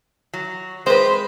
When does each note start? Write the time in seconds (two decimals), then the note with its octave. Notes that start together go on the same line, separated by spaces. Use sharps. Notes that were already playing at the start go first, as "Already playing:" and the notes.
0.33 F#3
0.86 G#3 B4 C5